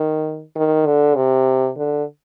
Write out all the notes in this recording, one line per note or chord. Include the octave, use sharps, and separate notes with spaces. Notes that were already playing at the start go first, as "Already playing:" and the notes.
Already playing: D#3
D#3
D3
C3
D3